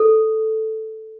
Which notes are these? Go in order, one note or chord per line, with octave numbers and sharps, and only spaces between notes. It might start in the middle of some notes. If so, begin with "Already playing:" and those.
Already playing: A4